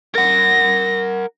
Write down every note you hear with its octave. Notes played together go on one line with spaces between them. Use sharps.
A#4 F#5 A#6